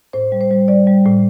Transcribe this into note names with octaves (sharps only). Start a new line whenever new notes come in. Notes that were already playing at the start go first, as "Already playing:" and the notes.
A2 C5
G3
C5
G3
G3 D5
G3
A2